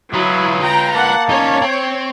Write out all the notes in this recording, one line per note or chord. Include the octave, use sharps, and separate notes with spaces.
F#3 E4 F4 B4 D#6
G5 A#5
A#3 F#5 A5
C#4 D#4 C#5
C4